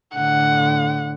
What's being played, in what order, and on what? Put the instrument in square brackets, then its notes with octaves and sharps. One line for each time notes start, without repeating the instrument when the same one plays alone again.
[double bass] A2 D3 [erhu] F#5